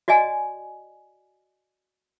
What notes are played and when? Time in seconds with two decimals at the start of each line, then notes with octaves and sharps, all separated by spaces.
0.08 F#4 D5 D#5 G#5